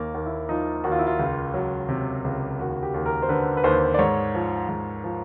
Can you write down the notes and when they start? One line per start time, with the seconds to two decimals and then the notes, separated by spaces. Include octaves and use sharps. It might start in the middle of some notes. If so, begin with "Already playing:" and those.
Already playing: D#2 A#3
0.14 D#2
0.26 E4
0.49 F3 D#4
0.84 D#2 F#4
0.92 F4
0.99 E4
1.07 F4
1.19 C#2
1.54 F#3
1.89 C3
2.24 C#2
2.59 D#2 F#4
2.83 G4
2.94 D#2
3.06 A#4
3.22 C5
3.29 D3 B4
3.57 B4
3.64 D#2 C5
3.94 D5
3.99 G#2 C#5
4.34 F3
4.69 G#2
5.04 F3